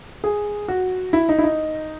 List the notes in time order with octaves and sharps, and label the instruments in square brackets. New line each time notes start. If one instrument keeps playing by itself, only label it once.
[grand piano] G#4
F#4
E4
D#4
E4
D#4